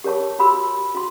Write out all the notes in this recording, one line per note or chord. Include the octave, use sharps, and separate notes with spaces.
G4 A#4 C#5 A5 C#6
F#4 G4 B5 C6 E6
F#4 C6